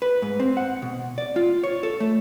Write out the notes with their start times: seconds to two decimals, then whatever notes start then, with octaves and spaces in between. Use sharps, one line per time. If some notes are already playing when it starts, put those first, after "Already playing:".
0.02 B4
0.22 G#2
0.40 C4
0.57 F#5
0.82 B2
1.18 D5
1.36 F4
1.64 C#5
1.83 A4
2.00 A3